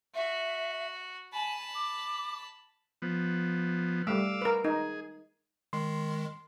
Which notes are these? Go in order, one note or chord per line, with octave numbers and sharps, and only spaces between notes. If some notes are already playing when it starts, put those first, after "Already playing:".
F#4 E5
G#5 A5 B5
D6
F3 B3
G3 A3 F5 D6 E6
A#4 B4
D#4 G#4
D#3 G#3 C6